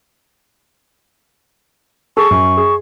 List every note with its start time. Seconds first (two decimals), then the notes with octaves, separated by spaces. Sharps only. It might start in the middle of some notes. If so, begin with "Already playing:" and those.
2.17 G#4 A4 C#6
2.31 F#2
2.57 G#4